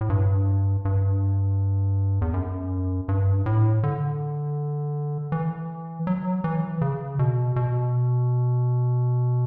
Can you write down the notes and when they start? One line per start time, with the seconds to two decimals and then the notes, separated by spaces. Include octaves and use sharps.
0.01 A2
0.10 G2
0.85 G2
2.21 E2
2.34 F#2
3.08 G2
3.46 A2
3.83 D3
5.32 E3
6.07 F#3
6.44 E3
6.81 C#3
7.19 B2
7.56 B2